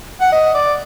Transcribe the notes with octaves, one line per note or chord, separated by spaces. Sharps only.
F#5
D#5
D5